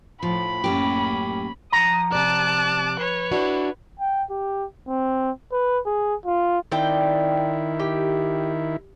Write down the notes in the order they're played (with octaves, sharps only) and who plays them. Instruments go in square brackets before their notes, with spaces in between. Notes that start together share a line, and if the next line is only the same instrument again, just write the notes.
[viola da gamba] A2 [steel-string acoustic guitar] F3 [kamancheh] B5
[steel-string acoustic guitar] F#2 A2 G4 [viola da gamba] A#3 C#4
[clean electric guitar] F3 F#5 A#5 [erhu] D#6
[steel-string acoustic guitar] C3 D5 [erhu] A5 [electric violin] D6 F#6
[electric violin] B4 [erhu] C#5
[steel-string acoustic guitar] D4 E4 F#4
[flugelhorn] G5
G4
C4
B4
G#4
F4
[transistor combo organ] D#3 E4 [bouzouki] C4 D5 G5
[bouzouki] G4